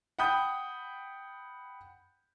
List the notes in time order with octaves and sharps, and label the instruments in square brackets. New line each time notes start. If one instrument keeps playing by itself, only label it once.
[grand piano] F#5 G5 B5 D#6 G6